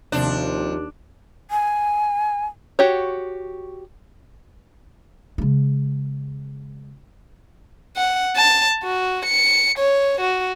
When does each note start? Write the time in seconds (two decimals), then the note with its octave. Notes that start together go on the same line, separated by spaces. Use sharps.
0.12 D#2 C3 F3 D4
1.51 G#5
2.79 F#4 G4 C#5
5.38 C#3 G#3
7.97 F#5
8.36 A5
8.84 F#4
9.26 C#7
9.79 C#5
10.21 F#4